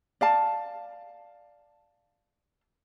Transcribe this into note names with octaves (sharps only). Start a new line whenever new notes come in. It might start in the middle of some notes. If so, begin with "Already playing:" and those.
D5 F5 A5